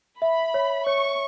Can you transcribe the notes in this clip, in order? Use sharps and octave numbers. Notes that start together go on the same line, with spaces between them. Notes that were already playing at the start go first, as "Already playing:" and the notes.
E5 B5
C#5
C#5 C#6